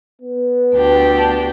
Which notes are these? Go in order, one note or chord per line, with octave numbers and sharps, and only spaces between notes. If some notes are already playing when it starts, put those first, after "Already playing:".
B3
D2 D4 G4